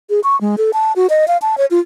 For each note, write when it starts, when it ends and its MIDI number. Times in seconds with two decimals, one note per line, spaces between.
0.10 0.20 68
0.24 0.39 85
0.41 0.56 56
0.58 0.71 69
0.73 0.93 81
0.96 1.07 66
1.10 1.28 75
1.28 1.37 77
1.42 1.58 81
1.58 1.66 73
1.71 1.80 65